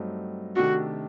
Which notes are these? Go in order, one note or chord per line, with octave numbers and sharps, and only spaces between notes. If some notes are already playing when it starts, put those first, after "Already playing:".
Already playing: G2 F#3 A3 C4 D#4
C3 D#3 A3 D4 F#4 A4